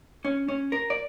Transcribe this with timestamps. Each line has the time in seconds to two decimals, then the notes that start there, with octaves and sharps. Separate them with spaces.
0.25 C#4
0.48 C#4
0.72 A#4
0.90 D5